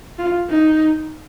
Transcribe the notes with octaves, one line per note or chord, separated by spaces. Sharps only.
F4
D#4